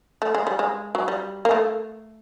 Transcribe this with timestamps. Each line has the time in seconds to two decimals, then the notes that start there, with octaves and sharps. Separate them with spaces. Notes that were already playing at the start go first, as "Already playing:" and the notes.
0.22 A3
0.35 G#3
0.47 G3
0.59 G#3
0.95 F#3
1.08 G3
1.45 A#3
1.51 A3